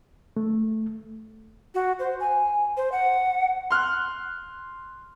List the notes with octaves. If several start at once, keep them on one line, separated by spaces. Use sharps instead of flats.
A3
F#4
C5
G#5
C5
F#5
C6 F6 F#6